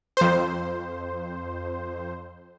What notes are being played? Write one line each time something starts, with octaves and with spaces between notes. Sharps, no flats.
F2 C5